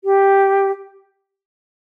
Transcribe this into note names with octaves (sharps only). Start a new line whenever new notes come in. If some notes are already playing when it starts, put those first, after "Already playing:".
G4